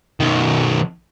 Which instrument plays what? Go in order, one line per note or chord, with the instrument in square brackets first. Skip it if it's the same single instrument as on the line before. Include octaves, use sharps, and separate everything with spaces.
[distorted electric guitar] B1 D#3